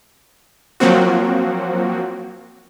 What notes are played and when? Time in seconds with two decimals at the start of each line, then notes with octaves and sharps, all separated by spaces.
0.80 F3 F#3 A#3 C4 F#4